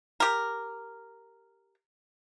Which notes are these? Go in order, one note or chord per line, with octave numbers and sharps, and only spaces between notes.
G4 A#4